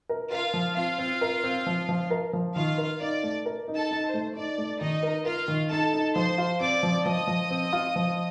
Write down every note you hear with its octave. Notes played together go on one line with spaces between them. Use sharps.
A#4
F4 A#4 F5
F3
C4 F4 F5
C4
A#4
C4
F3
F3
A#4
F3
D#3 F4 F5
A#4
D#4 D5
A3
A#4
D#4
A4 A5
D#4
C5
A3
D#4 D5
A3
D#3 D#4 D#5
A#4
F4 A#4 F5
D#3
D#4 A4 A5
D#4
F3 C5 C6
F4
C4 D5 D6
F3
F3 D#5 D#6
F3
C4
F4
F3